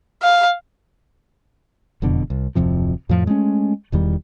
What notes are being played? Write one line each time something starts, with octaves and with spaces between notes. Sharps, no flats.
F5
E1 F2 B2 D3
C2
D1 F2 C3 F3
F2 A2 F3
G#3 A3 C4 C#4
E1 E2 D#3 G3